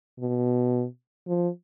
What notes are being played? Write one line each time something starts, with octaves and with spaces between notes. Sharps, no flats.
B2
F3